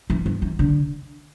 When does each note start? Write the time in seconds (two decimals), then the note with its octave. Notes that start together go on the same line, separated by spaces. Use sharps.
0.10 E3
0.26 E3
0.42 E3
0.59 D3